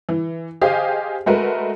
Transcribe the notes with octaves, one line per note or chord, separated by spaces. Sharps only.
E3
G4 G#4 C5 D#5 F5
G#3 A3 F#4 A#4 B4